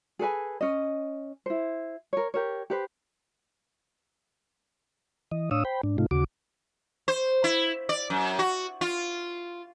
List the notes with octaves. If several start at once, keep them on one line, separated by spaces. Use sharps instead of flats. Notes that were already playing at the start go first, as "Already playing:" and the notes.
G#4 A4 B4 G#5
C#4 D#5
E4 C5
A#4 C#5
G4 A#4 C#5
G4 B4 C5
E3 D#5
A2 D4 C#5 F5 D#6 E6
C5 G5 B5
G#2 D4
G#2 C3 A3 D#4 F4
D#2 C#3 F#4 D6
C5
E4
D5
F#2
F#4
F4